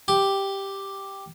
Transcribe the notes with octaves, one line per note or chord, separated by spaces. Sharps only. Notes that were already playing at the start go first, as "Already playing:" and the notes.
G4